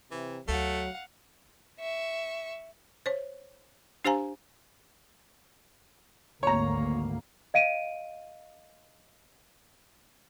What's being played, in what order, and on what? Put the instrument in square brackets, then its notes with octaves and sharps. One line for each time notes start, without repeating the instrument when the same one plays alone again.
[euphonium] C3 [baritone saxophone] E3
[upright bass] D2 [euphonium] F#3 [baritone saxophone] A3 [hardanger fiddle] F5 F#5
[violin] E5 C#6
[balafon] C5 C#5
D4 G4 C5 F5 G#5 A#5
[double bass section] G#1 D2 A#3 [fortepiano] C#5 A#5
[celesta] D#5 F5 D7 D#7